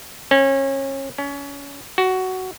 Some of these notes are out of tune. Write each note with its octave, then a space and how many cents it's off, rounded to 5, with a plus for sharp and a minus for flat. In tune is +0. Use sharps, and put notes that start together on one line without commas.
C#4 -30
C#4 +25
F#4 +10